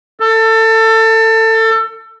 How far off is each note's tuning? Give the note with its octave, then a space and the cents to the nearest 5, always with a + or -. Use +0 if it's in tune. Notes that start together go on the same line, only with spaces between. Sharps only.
A4 +25